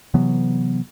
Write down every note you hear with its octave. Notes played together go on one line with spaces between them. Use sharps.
C3 E3 F#3 B3